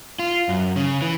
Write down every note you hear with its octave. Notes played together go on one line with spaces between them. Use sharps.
F4
F#2
C#3
E3